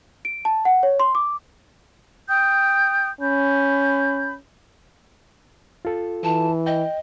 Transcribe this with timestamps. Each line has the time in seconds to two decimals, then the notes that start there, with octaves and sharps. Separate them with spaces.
0.25 D7
0.45 A5
0.65 F#5
0.83 C#5
1.00 C6
1.15 D6
2.28 G5 D#6 G6
3.21 C#4 B5 G6
5.85 F4 A4
6.24 E3 A5
6.66 D#5 G5